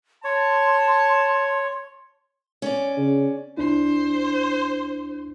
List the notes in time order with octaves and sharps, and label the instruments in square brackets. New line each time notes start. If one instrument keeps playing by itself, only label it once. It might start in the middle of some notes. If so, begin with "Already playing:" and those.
[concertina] C#5 [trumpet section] A5 [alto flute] C6
[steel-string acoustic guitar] C#4 D5
[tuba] C#3
[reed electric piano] C#2 D4 E4 [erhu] C5